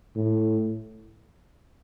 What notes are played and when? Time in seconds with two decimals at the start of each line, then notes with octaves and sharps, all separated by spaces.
0.16 A2